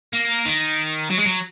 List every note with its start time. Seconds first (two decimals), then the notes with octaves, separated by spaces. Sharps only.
0.13 A#3
0.45 D#3
1.10 F#3
1.18 G#3
1.25 F#3